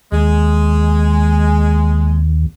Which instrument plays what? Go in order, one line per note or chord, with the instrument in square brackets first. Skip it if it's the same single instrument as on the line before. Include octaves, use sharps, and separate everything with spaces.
[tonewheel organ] D#2 [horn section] G#3